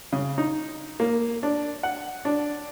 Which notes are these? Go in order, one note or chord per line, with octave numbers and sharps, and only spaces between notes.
C#3
D#4
A#3
D4
F#5
D4